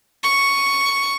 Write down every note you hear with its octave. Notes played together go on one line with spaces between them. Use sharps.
C#6